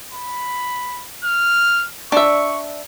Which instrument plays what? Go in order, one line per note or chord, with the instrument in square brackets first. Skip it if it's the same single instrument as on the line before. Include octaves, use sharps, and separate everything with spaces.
[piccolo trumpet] B5
F6
[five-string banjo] D4 E5 [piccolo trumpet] C#6